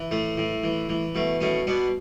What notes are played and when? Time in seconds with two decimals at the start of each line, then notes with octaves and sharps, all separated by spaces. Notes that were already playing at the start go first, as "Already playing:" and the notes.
Already playing: E3
0.11 A2 A3
0.37 A2
0.63 E3
0.89 E3
1.15 B2 A3
1.41 B2 A3 C#4
1.67 B2 B3 D4